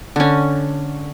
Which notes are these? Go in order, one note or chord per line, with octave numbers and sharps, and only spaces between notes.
D3 C#4